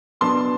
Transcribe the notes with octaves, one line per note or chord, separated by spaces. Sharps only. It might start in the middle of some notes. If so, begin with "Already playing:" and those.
B2 F#3 B3 D4 A5 C6